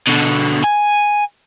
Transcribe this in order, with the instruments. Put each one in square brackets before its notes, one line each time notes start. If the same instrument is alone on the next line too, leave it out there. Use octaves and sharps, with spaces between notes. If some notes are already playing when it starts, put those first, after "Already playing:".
[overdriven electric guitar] B2 D3
G#5